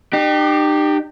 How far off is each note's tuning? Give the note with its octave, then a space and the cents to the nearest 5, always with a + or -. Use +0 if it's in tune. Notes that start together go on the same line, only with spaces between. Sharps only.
D#4 -45 G4 +0